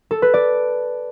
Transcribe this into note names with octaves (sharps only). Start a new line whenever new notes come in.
A4
B4
D5